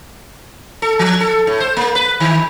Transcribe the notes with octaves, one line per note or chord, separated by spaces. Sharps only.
A4
F3
A4
A2
C5
A#3
B4
D#3